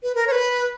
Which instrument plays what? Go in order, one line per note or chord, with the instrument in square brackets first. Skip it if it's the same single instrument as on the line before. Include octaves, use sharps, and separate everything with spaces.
[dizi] B4
A#4
C#5
B4